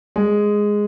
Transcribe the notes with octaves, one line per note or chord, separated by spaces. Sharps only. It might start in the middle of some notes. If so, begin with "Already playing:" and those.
G#3